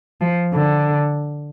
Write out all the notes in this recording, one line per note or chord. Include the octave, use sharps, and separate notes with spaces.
F3
D3